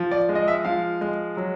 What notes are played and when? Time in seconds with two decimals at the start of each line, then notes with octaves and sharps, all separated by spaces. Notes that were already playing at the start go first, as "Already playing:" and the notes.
Already playing: F3
0.11 D5
0.29 G#3
0.35 D#5
0.48 E5
0.65 F3 F5
1.01 G#3
1.37 F#3